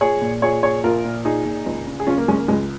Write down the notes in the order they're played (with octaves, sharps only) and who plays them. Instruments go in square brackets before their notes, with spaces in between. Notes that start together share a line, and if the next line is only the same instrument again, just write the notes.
[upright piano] A#1 G#4 C#5
A#2
A#1 G#4 C#5
A#2 G#4 C#5
A#1 F4 A#4
A#2
A#1 D#4 G#4
A#2
C#2
C#3
G#4
C#2 C#4 F4
A#3
C#3 G#3 C#4
A#3
C#2 G#3